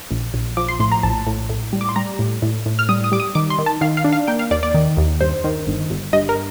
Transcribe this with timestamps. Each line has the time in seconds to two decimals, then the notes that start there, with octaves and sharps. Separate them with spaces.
0.10 A#1
0.34 A#1
0.57 F3 D6
0.68 C6
0.80 A2 C6
0.92 A#5
1.03 A#1 A5
1.27 A2
1.49 A2
1.73 G3
1.81 D6
1.89 C6
1.96 G3 A#5
2.19 A2
2.42 A2
2.66 A2
2.79 F6
2.89 G3 D#6
3.04 D#6
3.12 G3 D6
3.20 D#6
3.35 D#3 D6
3.50 C6
3.58 D#3
3.66 A5
3.81 D#3 F5
3.97 F5
4.04 D4
4.12 F5
4.27 A#3 G5
4.39 F5
4.51 D#2 D5
4.63 D5
4.74 D#3
4.97 D#2
5.21 G2 C5
5.44 D#3
5.67 G1
5.90 G1
6.13 G2 D#5
6.29 A#4